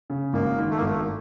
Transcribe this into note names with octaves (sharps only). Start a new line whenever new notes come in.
C#3
G#1 A#3
D#3
A3
A#3
G#1 A3